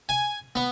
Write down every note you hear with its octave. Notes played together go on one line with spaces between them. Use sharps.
G#5
B3